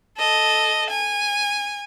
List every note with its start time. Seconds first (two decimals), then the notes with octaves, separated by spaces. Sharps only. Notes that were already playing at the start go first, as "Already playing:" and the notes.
0.18 A4 D#5
0.90 G#5